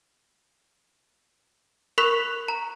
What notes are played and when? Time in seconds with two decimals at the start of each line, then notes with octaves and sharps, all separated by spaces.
1.98 A#4 B5 C#6 F#6 B6 F7
2.48 A#5